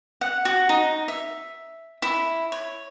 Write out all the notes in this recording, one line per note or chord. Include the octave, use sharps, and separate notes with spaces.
F#5
F#4
D#4
E5
E4
C#5